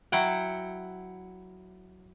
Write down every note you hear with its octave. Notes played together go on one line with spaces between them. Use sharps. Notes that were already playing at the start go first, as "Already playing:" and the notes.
F#3 E4 F#5 G5